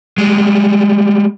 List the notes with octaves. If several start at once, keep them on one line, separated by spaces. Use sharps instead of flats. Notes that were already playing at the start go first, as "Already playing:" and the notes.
G3 G#3